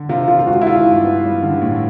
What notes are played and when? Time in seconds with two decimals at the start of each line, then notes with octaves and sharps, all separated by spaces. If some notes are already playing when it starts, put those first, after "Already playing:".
Already playing: D3
0.09 C3 F4
0.28 C3 F4
0.39 F4
0.47 G#3 F#4
0.61 E4
0.67 D#3 F4
0.85 G2
1.04 B3
1.24 G3
1.42 D3
1.62 A2